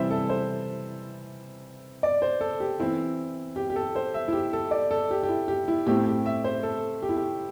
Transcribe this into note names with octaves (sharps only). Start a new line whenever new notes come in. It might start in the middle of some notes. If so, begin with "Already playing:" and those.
Already playing: C3 E3 G3 E4 C5 E5
A4
C5
D5
C5
A4
G4
E3 C4 E4
G4
G4
A4
C5
E5
E4
G4
A4
D5
A4
G4
G4
E4
G4
E4
A2 A3 C4 E4 G4
G4
E5
C5
A4
G4
E4
G4